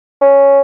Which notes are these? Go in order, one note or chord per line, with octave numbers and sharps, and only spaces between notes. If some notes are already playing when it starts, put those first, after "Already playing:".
C#4